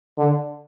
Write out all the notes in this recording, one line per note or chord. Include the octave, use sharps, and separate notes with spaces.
D3